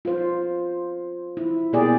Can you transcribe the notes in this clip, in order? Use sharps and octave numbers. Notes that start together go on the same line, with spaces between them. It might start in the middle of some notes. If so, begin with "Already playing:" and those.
F4 C5
E4
B2 A#3 E4 G4 G#4 D5